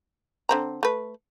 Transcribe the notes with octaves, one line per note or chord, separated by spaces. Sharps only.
D3 C4 A#5
A3 B4